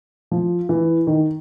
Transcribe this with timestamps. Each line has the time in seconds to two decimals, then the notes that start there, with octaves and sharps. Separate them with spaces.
0.31 F3
0.69 E3
1.07 D#3